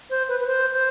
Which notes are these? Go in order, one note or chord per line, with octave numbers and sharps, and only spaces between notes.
C5
B4
B4
C5
C5